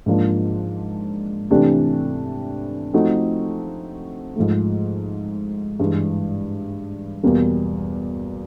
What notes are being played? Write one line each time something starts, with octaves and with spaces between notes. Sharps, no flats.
G#2 F3 A#3 D4
C3 E3 A3 D4 G4
F3 A3 C4 D#4 F#4
G#2 F3 A3
G2 E3 G#3
E2 B2 G3 A#3